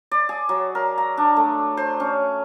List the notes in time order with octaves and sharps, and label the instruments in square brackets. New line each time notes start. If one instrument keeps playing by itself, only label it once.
[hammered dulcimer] D5
G#4
F#3
A#4
A#5
D4
A3
C5
C#4